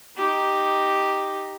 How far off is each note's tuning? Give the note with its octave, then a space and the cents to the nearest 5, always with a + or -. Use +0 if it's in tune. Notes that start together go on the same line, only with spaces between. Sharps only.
D#4 +0 G4 +0